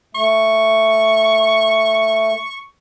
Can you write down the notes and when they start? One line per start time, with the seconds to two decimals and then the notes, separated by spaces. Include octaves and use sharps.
0.15 A3 C#6